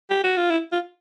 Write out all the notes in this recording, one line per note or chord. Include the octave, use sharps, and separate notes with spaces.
G4
F#4
F4
E4
F4